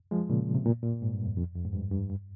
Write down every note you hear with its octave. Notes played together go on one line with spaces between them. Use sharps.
F3 G#3
A#2 C#3
C3
A#2
A#2
G#2
G2
F2
F2
F2
G#2
G2
G2
G2